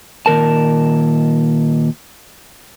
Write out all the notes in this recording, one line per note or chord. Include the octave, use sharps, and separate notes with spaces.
A#2 D#3 A#4 A5